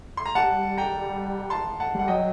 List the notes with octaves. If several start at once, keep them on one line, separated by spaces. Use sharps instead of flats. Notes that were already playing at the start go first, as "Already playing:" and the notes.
C6
A#5
G3 F#5 A5
G5 A#5
A5 C6
F#5 A5
G3 F#5
F#3 D#5 G5